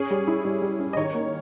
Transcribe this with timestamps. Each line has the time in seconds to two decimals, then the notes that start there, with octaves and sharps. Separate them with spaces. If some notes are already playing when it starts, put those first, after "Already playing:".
Already playing: C#4 G#4
0.11 G3
0.28 E4
0.45 G3
0.62 G3
0.79 C#4
0.93 D#5
0.97 D#3 C#5
1.15 A#3